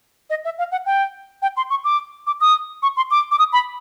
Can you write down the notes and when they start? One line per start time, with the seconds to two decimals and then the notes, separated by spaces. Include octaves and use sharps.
0.30 D#5
0.45 E5
0.58 F5
0.72 F#5
0.86 G5
1.42 G5
1.57 C6
1.70 C#6
1.84 D6
2.27 D6
2.41 D#6
2.83 C#6
2.97 C6
3.11 D6
3.31 D6
3.39 D#6
3.53 B5